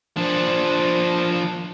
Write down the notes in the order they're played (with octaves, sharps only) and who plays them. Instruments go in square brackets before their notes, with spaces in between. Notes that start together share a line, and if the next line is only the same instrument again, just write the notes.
[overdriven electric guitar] F3 D4